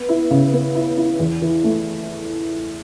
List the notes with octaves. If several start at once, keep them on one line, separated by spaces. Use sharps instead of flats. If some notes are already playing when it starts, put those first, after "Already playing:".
Already playing: B3
E4
C#3
B3
E4
E4
E2
E3
A3